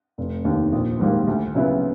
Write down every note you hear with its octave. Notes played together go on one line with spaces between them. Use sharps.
F1
D#2 D#3
A#1
G#2 D#3 G3 A#3
D2
C#3 F#3 B3 E4